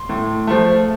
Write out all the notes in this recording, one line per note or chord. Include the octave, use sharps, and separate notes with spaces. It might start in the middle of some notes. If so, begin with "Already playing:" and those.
Already playing: C6
A2
F3 A3